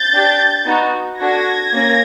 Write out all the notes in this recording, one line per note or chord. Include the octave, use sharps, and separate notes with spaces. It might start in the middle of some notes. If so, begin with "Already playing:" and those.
Already playing: G6 A6
D4 G4
B3 D#4 F#4
D4 F#4 A4 G#6 A#6
A#3 C#4